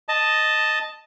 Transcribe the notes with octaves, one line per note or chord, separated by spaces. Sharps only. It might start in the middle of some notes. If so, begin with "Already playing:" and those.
D#5 A5